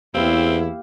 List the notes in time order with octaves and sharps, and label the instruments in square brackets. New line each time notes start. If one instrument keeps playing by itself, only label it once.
[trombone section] E2 [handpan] A#3 G4 F5 [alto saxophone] C4 [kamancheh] E4